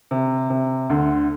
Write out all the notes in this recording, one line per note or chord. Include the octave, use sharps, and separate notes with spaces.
C3
C3
D2 D3